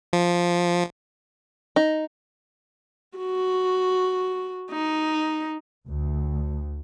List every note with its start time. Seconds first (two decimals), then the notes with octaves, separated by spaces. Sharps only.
0.13 F3
1.76 D#4
3.18 F#4
4.70 D#4
5.89 D2